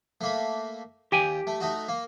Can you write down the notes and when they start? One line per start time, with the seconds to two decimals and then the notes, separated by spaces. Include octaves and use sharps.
0.21 A3 A#3 B5
1.12 D#2 G4 G5 G#5
1.47 A3
1.60 A3 D#4 F#4
1.88 A#3